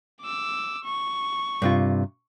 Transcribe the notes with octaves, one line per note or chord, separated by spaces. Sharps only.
D6 E6
C#6
G2 C3 F4